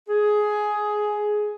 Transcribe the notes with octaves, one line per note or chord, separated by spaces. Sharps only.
G#4